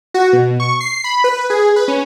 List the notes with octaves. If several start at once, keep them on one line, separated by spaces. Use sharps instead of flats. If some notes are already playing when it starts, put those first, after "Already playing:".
F#4
B2
C#6
C7
B5
B4
G#4
B4
C#4